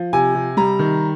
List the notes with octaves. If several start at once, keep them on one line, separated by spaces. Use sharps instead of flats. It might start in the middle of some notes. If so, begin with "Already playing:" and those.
Already playing: F3
C3 G#5
C3
G3 A#5
D#3